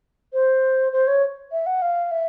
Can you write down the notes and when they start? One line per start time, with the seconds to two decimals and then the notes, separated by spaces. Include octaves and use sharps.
0.33 C5
0.93 C5
1.07 C#5
1.52 E5
1.66 F#5
1.82 F5
2.11 E5